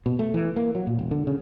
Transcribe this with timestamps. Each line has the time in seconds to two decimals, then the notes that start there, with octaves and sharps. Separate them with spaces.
0.06 B2
0.19 A3
0.34 E3
0.56 A#3
0.75 F#3
0.87 A#2
0.99 E1
1.11 D3
1.27 C#3